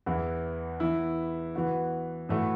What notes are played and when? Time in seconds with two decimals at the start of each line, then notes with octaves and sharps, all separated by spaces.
0.06 E2 E3 B3 E4
0.80 E3 B3 E4
1.55 E3 B3 F#4
2.29 A2 E3 A3 F#4